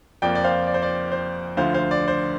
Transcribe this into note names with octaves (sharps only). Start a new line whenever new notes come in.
F2 F3 A#3 F4 D5 G5
D5
C5 F5
D5
C5
D5
C5
D2 D3 F3 C5 F5
C5 F5
D5
C5